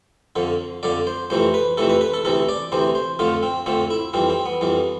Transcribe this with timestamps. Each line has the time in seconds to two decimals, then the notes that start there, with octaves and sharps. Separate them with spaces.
0.36 F2 D3 F3
0.83 F2 D3 F3 D5
1.07 C5
1.30 F2 C3 E3 A3 C5
1.54 B4
1.77 F2 C3 E3 A3 A4
1.90 B4
2.01 B4
2.14 A4
2.25 D2 C3 E3 A4
2.49 D5
2.72 D2 C3 E3 C5
2.95 C5
3.19 F2 D3 F3 A3 F4
3.43 C4
3.66 F2 D3 F3 A3 C4
3.90 E4
4.13 F2 E3 G3 C4
4.30 C4
4.46 B3
4.61 F2 E3 G3